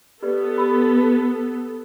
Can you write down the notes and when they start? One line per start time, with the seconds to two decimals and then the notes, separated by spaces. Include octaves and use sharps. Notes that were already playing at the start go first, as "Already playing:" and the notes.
0.23 B3 G4 A4 B4 D5
0.56 G4 B5 E6